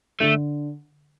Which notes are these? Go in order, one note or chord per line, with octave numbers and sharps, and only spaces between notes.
D3 A3